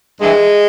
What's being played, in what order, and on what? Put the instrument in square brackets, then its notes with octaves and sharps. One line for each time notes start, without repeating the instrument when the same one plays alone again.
[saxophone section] G2 E3 G#3